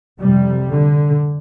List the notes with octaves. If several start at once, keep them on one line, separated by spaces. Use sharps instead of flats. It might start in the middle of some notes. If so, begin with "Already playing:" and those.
F2 C3 G3
D3